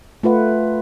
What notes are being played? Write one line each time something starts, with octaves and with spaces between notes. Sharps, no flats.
A3 F4 B4 F#5